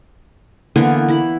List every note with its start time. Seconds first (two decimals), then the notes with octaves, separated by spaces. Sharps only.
0.76 D3 E3 A#3 B3
1.08 E4 B5